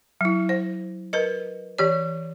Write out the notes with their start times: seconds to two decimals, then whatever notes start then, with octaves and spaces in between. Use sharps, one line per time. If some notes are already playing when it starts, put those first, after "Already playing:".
0.21 F#3 E4
0.49 C5
1.13 A#4 B4 D#5
1.78 E3 G4 C#5